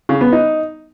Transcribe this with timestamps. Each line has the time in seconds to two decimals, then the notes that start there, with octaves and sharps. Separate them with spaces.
0.09 C#3
0.21 B3
0.33 D#4